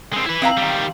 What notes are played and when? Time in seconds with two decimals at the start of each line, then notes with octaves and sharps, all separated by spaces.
0.14 G#3 C4
0.27 E4 B4
0.42 C4 F5 A#5
0.58 D#3 G3